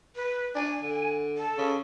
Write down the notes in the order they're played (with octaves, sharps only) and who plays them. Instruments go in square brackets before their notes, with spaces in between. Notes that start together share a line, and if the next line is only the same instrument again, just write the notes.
[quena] B4
[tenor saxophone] D4 [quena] G#5
[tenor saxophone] D3
[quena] A4
[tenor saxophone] C#3